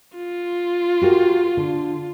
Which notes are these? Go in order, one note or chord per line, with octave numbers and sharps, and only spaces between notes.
F4
F#4 G4 A#4
D3